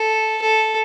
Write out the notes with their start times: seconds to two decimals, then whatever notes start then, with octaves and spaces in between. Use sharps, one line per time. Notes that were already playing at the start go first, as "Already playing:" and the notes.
Already playing: A4
0.42 A4